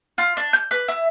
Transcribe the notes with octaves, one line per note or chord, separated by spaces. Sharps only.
F4
D4
G6
B4
E4